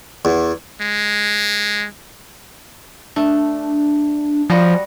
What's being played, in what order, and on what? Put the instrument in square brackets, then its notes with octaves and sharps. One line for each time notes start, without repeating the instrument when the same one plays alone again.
[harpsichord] E2
[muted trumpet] G#3
[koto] A3 [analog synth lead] D4
[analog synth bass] F3 [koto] G3 F#4 D#5